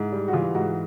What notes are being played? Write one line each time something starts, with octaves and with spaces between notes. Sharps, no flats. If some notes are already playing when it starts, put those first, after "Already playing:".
Already playing: G#2 E4
G3
F#4
E3 F4
G#2 F#4